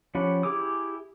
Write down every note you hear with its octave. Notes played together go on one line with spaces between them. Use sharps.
F3 C#4 G4 F#5 B5
E4 G4 G#4 D6 D#6